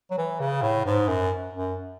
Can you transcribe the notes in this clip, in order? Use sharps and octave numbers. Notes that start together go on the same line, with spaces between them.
F#3
E3
C#3
A2
G#2
F#2
F#2